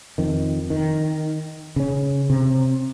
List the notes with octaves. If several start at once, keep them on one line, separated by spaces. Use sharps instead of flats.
F2 D#3
D#3
C#3 C#4
C3